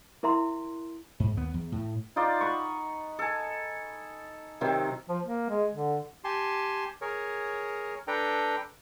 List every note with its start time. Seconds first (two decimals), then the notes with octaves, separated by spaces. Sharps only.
0.23 E4 A#4 E5 A#5 C6
1.20 G#2
1.37 D#2 B3
1.54 E2
1.72 A2
2.16 D#4 F4 C5 D5
2.41 F#5 B5 C#6
3.19 A4 G#5
4.61 C3 D#3 F#3 C4
5.09 F3
5.25 A#3
5.50 G#3
5.74 D3
6.24 G4 G#5 A5 C6
7.01 G#4 A#4 C#5
8.07 D4 A4 B4 G5 A#5